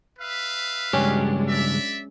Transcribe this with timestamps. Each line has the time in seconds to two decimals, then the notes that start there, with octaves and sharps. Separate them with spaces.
0.19 B4 E5 F5
0.93 C#2 G2 F#3 G#3 C#4 D4 G4
1.48 D5 E5